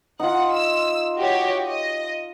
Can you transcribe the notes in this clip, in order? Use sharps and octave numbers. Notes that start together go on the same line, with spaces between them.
D#4 F4 F#5
E6
F#4 G4 C#5
D#5